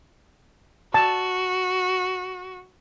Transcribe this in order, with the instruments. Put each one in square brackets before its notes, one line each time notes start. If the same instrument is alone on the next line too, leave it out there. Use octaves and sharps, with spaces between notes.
[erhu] F#4 [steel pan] A5